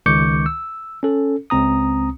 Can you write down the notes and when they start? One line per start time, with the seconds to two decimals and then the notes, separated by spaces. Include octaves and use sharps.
0.06 C#2 D#3 C#6 D6 G6 C#7
0.46 E6
1.03 C#4 A4
1.50 C#2 C4 A#5 D#6